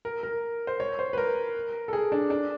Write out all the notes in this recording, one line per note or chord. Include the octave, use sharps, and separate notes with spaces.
A#4
A#4
C5
C#5
C5
B4
A#4
A4
G#4
D4
D4